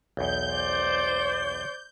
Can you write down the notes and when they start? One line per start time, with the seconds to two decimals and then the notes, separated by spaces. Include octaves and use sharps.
0.17 B1 E2 G6
0.51 C5 D5